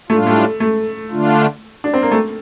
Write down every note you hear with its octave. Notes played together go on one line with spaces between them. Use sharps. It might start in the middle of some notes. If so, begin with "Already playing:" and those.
A2 G3 A3 D4 F4
A3
A3
D3 A3 D4 F4
D4
C4
A#3
A3